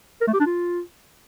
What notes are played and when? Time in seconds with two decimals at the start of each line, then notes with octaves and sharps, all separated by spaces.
0.21 A#4
0.27 A3
0.33 G4
0.40 D4
0.46 F4